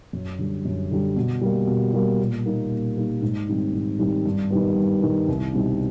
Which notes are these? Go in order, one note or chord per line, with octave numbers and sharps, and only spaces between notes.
F#2
D3 G3
F#2
D3 G3
B2
G3 A#3
B2
G3 A#3
A#2
G3 A#3 D#4
A#2
G3 A#3 D#4
G#2
D#3 G3 C4
G#2
D#3 G3 C4
G2
D#3 G3 B3
G2
D#3 G3 B3
C2
B2 G3 C4 D#4